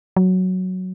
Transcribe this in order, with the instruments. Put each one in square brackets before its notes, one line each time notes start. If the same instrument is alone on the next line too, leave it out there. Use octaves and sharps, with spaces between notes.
[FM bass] F#3